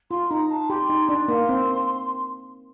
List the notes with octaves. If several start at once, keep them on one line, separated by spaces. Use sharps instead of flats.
F4 C6
D#4 A#5
A5
G4 C6
D#4
D4 C6
A#3
C4